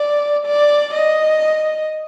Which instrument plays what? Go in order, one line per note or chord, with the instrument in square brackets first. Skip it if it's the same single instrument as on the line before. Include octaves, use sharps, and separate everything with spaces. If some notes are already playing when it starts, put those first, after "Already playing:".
Already playing: [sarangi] D5
D5
D#5